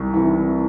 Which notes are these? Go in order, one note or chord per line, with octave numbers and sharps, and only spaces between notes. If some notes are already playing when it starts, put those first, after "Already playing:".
Already playing: C2 C#6
C3 E3